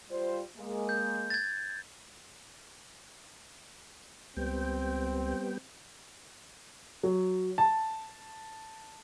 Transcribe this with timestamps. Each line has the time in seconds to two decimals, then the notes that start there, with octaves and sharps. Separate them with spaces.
0.10 G3 F4 C5
0.57 G#3 A#3
0.89 G6
1.30 G#6 A6
4.37 C#2 G3 B3 C4 G5
7.03 F#3
7.58 A5